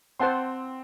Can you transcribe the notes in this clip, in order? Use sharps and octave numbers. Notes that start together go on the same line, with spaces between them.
C4 C5 F#5 A5 C6